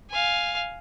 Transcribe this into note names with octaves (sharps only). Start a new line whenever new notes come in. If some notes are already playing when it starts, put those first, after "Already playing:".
F5 G#5